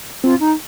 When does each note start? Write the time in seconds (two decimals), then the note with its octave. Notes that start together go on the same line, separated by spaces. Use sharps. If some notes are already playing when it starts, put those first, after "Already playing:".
0.24 C4 F4
0.40 D#4